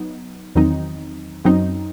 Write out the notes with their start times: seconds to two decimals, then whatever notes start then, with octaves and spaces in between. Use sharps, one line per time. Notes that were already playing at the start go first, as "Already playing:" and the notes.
Already playing: F#3 B3 D#4
0.55 E2 D#3 F#3 C4 D#4
1.44 F#2 F#3 C4 D#4